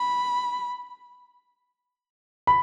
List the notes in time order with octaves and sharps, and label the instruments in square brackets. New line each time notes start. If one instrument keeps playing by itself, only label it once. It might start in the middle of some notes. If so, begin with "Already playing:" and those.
Already playing: [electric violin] B5
[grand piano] B5